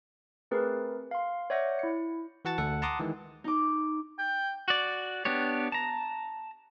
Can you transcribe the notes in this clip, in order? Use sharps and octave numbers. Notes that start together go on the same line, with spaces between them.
A3 C4 G#4 A#4 B4
F5 C6
C#5 D5 E5 F#5 G6 A#6
E4 C#7
E3 F#4 F#5 A5 A6
D2 A4 F#5
F#5 A5 A#5 C6 D6 D#6
D#3 E3 G#3
D#4 D6
G5
F#4 D5
B3 D4 G4 C#5
A5 A#5